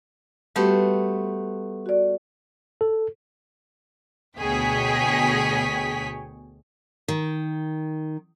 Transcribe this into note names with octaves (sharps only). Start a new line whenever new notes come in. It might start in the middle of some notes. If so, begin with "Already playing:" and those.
G3 A3 B3 F#4 G4 C5
F#4 D5
A4
D2 B2 G#4 C#5 G5 B6
D#3